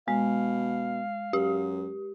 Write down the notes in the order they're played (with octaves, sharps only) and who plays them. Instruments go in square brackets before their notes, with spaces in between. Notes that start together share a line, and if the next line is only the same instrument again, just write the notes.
[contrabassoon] B2 [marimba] G#3 [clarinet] F5
[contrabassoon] F#2 [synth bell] G4